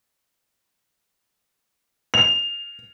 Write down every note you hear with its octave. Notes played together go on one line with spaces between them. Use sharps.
F7